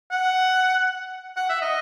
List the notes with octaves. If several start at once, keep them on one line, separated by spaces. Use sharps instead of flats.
F#5
F#5
E5
D#5